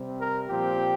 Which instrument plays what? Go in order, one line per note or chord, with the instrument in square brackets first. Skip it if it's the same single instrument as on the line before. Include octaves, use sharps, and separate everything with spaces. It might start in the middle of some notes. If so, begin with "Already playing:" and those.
Already playing: [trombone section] C3 G3 C4
A#4
A#2 F3 C4 G4